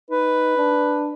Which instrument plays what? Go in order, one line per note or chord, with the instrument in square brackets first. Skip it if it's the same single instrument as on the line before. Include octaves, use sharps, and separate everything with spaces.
[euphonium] D#4 [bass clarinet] B4
[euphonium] D4